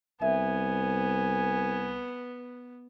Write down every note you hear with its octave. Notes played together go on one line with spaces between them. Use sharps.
C2 B3 E5 G#5